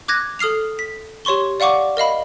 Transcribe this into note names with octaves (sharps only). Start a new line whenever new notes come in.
D6 F#6 G#6 A#6
A4 D#6 F6 C7 F7
B6
G4 C#5 C6 C#6 G7
D5 F5 F#5 C#6 D6
A#4 D#5 F5 B5